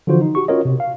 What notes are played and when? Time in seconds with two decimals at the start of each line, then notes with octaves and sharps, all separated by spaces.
0.07 D3 E3 F3 F4 F#4 C5
0.21 D#4
0.35 F#4 G4 C#6
0.48 C#4 F4 F#4 A#4 C#5 D#5
0.65 C3
0.80 F5